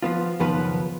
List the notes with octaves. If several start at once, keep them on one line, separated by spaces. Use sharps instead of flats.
F3 B3 F4
C#2 F#2 D#3 F3 B3 B4